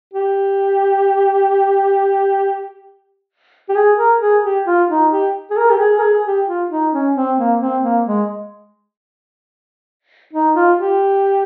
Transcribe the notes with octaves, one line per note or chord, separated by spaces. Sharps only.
G4
G4
G#4
A#4
G#4
G4
F4
D#4
G4
G#4
A#4
G4
G#4
A#4
G#4
G4
F4
D#4
C#4
C4
A#3
C4
A#3
G#3
D#4
F4
G4